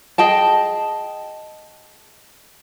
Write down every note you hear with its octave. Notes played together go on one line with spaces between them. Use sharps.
G#4 D#5 G5 A5